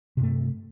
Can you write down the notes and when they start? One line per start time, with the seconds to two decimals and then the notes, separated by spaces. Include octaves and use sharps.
0.17 C3
0.20 G2
0.23 A3